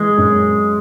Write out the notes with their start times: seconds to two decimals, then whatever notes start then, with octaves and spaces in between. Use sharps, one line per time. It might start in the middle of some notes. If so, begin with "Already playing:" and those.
Already playing: E3 G#3
0.17 F#2